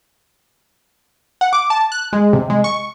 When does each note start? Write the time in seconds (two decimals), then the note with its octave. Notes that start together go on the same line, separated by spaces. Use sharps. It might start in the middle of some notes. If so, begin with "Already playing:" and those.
1.41 F#5
1.53 D6
1.70 A5
1.92 F#6
2.13 G#3
2.33 C3
2.50 G#3
2.64 C#6